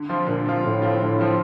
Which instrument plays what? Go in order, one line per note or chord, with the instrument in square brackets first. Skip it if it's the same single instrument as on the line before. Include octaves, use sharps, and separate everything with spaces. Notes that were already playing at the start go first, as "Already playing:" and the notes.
Already playing: [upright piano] D3
F3 C4 F4
[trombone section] A#2 [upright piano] D3
[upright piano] F3 C4 F4
[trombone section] A2 [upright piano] D3
[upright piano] F3 C4 F4
[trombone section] A2 [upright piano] D3
[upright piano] F3 C4 F4